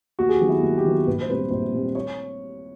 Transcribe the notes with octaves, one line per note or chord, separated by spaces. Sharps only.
D#2 F#4
G#4
G4
D#3 F#3 B3
E4
D#2
G4
D#3 F#3 B3
A#1 B4
C5
A#2 G3 C4 B4
A#1 C5
A#2 G3 C4
C#5